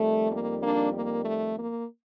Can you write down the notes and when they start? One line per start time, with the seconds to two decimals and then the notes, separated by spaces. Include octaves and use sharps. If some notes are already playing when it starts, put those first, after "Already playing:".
Already playing: F2 D#3 G3 A3
0.30 A#3
0.61 A#3 D4
0.93 A#3
1.25 A3
1.57 A#3